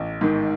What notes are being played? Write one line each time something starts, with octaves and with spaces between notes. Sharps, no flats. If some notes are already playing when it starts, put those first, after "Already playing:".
Already playing: A1
G#2 D#3